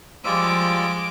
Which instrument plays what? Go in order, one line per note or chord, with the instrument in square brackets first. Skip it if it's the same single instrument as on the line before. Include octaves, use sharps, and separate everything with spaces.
[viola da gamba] F3 [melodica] G3 F4 E6 [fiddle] G#3 D6